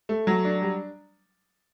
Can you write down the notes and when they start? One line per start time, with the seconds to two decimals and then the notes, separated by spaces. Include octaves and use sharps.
0.09 A3
0.27 F#3
0.45 D4
0.62 G3